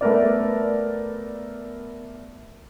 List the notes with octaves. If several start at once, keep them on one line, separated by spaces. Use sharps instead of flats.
A3 B3 A#4 D5